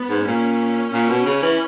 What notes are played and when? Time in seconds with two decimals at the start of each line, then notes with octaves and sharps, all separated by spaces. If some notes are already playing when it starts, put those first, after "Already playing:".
Already playing: B3
0.10 G#2
0.27 A#2 C#4
0.93 A#2
1.10 B2
1.26 C#3
1.43 E3